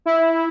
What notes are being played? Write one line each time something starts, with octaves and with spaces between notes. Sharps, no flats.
E4